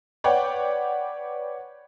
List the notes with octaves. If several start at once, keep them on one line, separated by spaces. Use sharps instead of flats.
B4 C#5 D5 F#5 G5